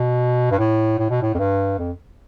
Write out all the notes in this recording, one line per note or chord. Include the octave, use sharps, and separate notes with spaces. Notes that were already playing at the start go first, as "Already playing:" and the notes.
Already playing: B2
G2
A2
A2
B2
A2
F2
G2
F2